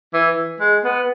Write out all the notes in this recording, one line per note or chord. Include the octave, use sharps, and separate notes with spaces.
E3
G#3
B3